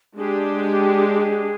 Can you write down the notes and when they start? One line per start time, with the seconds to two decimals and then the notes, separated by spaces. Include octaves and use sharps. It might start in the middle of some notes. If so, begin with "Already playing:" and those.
0.16 G#3 D4 G4 G#4